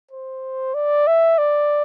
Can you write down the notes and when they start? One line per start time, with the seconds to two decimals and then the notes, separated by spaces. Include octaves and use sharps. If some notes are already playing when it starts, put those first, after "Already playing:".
0.11 C5
0.74 D5
1.07 E5
1.38 D5